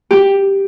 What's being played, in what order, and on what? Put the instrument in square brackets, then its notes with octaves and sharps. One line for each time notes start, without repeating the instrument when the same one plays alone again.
[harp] G4